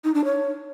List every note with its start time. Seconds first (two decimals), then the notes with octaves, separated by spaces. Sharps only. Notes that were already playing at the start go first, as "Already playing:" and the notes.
0.04 D#4
0.14 D4
0.24 C#5